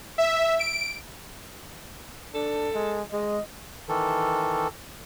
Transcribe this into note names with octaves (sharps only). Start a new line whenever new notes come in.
E5
D7
D4 A4
G#3
G#3 D#5
D#3 E3 A4